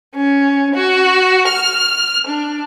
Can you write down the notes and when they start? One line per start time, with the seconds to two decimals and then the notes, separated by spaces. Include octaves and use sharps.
0.15 C#4
0.75 F#4
1.48 F6
2.27 D4